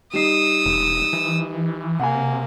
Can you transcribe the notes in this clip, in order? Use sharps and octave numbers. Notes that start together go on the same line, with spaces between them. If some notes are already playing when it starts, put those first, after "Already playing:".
G3 D#4 D#6 E6 C7
E1
E3
C3 A#3 F#5 G#5